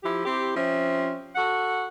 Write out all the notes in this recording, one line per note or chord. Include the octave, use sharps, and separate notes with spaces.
F3 E4 G4
C4 E4 G4
F3 C4 C#4 E5
F#4 A4 F#5